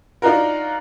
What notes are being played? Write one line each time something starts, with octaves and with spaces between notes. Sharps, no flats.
D4 D#4 F4 F#4 A#4